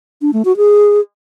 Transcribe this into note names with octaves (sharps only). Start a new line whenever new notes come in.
D4
A3
F#4
G#4